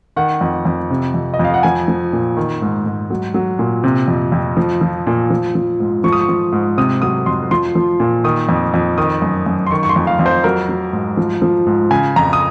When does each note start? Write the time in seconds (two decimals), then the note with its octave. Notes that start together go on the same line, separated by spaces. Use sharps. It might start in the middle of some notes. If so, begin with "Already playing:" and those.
0.16 D#3 F#5
0.41 F2
0.65 F2
0.91 C3
1.14 F2
1.34 D#5
1.39 F2
1.44 F5
1.54 F#5
1.63 F3 G#5
1.88 F3
2.13 A#2
2.37 D#3
2.62 G#2
2.86 G#2
3.10 F#3
3.34 F#3
3.59 A#2
3.84 C3
4.08 F2
4.32 F2
4.57 F3
4.81 F3
5.07 A#2
5.30 F3
5.55 F3
5.80 G#2
6.04 F3 C#6
6.12 D#6
6.21 C#6
6.29 F3
6.52 G#2
6.78 C3 D#6
7.02 F#3 D#6
7.26 F2 C6
7.51 F3 C6
7.75 F3
8.00 A#2
8.24 D#3 D#6
8.49 F2
8.74 F2
8.98 D#3 D#6
9.22 F#2
9.46 F#2
9.67 C6
9.71 D#3 C#6
9.83 C#6
9.89 C6
9.96 F2
10.07 F5
10.19 F2
10.26 C5
10.44 F#3 A#4
10.69 F#3
10.93 G#2
11.17 F3
11.42 F3
11.66 G#2
11.91 C#3 G#5
12.16 F2 A#5
12.33 D#6